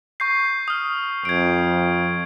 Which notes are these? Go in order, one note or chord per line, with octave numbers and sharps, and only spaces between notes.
C#6 G6 C7
D#6 F6
F2 G#6 D7